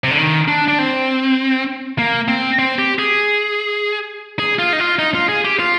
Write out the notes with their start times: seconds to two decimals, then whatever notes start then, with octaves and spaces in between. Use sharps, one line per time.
0.04 C3
0.11 D3
0.18 D#3
0.48 D4
0.68 D4
0.79 C4
1.99 A#3
2.28 C4
2.59 C4
2.79 G4
2.99 G#4
4.39 G#4
4.59 F4
4.73 D#4
4.80 F4
4.99 D#4
5.14 F4
5.29 G#4
5.45 G4
5.59 F4